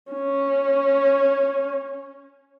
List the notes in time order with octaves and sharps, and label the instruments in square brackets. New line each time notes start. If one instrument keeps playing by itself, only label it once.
[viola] C#4